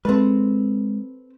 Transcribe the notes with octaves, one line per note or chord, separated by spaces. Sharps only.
G#3 C4 A4 B4